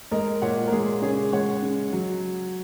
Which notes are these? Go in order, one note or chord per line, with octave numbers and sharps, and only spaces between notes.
G#3 A#4 D#5
A#2 C#5 F#5
A#4
G#3 G#4
C#3 G#4 C#5
G#3 C#5 F#5
C#3
F#3